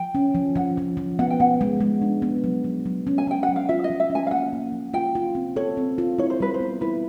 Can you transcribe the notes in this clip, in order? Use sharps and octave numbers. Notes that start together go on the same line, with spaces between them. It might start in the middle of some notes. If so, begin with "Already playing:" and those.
Already playing: F3 G5
C#4
F3
F3 F#5
F3
F3
B3 F#5
G5
B3 F#5
G#3
G#3
D4
B3
F#3
F#3
F#3
C#4
G#5
C#4 G5
F#5
F#3
F5
F4 E5
D#5
F3
E5
C#4
G#5
F5
A#3 F#5
A#3
F3
F4 G5
F4
C4
A4 C#5
C4
F4
E4 C#5
C5
G3 B4
C5
B3
E4 B4